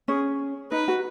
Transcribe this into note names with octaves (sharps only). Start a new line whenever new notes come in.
C#4 G#4
D#4 B4
F#4